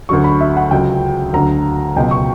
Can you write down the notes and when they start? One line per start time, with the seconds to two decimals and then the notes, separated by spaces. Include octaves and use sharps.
0.09 D2 D3 F#3 C#6
0.24 B5
0.40 E5
0.57 F#5
0.71 C#2 C#3 F#3 G5
1.33 D2 D3 F#3 A#5
1.96 C#2 B2 F#3 G5
2.11 C#6